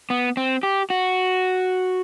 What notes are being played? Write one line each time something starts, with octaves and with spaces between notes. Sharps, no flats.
B3
C4
G4
F#4